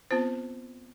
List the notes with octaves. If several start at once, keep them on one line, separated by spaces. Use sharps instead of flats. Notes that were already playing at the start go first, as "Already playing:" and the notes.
B3 C4 F4 C5